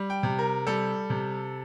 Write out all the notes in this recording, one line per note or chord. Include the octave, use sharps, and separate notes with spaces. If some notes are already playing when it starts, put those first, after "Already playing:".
Already playing: G3
G5
C3
A#4
G3 A4
C3